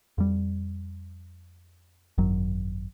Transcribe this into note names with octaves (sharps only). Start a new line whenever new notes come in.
F2 G3
G#1 F#2 F#3